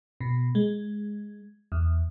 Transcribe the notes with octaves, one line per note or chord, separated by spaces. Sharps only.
B2
G#3
E2